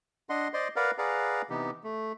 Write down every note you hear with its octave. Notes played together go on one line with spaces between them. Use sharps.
D4 D#5 F#5 C6
C5 D5 D#5 C6
A#4 B4 D5 F5 F#5 A#5
G#4 B4 D5 F5 F#5 A#5
C3 E3 B3 D#4 G4
A3